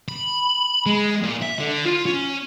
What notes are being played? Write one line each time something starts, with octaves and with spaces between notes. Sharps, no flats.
B5
G#3
A#2
E5
D3
F4
C#4